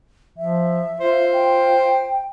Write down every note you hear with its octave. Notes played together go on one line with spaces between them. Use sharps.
F3 E5
F4 C5
G5